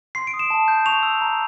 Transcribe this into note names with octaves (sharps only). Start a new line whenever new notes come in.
C6 C7
D7
D#6
E7
A5
G6
C#6 F7
E6
A#5